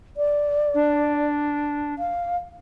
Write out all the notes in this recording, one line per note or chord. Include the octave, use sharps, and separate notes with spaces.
D5
D4
F5